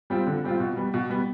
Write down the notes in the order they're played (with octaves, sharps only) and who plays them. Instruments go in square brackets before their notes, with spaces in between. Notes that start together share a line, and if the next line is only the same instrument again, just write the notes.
[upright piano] G3 C4 F4
D3
G3 C4 F4
B2
G3 B3
B2
G3 B3